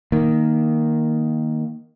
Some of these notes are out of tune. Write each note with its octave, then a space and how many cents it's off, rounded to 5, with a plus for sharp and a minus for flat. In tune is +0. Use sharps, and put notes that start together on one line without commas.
D#3 +0 A#3 +0